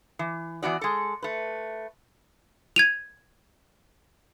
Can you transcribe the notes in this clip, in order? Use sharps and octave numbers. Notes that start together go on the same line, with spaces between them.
E3
E3 B3 F#4 D5
G#3 A4
A3 B4
G#6 D#7 F7